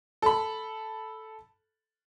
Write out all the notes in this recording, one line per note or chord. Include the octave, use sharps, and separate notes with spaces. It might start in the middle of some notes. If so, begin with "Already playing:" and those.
A4 B5